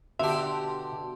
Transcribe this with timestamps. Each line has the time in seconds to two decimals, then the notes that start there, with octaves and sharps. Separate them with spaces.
0.19 B2 D3 G4 E5 A5 C6